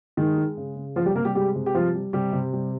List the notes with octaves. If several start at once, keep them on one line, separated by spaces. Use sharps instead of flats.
D#3 G#3 D#4
G#3
C#3
C#3
F3 F4
G3 G4
C3 A#3 A#4
G3 G4
G3 G#3 G4
C3
G4
F3 G3 F4
G3
C3 G3 G4
C3
G3